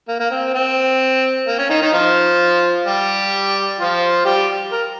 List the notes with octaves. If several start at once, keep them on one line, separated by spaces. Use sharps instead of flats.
A#3
A#3
C4
C4
A#3
C#4
D#3 D#4
D#3 D#4
F3 F4
G3 G4
F3 F4
G3 G4
A#4